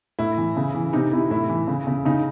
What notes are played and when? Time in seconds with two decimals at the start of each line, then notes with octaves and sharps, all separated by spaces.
0.19 A2 E4
0.37 E3
0.57 C#3
0.74 E3
0.93 C3 D#4
1.12 C3 E4
1.30 A2 E4
1.49 E3
1.68 C#3
1.87 C#3
2.05 C#3 D#4